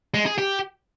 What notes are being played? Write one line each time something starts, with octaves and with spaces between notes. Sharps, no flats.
G#3
G#4
G4